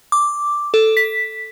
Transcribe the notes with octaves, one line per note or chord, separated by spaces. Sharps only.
D6
A4
B6